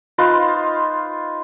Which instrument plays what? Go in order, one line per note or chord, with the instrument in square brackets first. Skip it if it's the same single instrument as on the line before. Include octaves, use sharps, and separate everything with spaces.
[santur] D#4 F4 B4 C5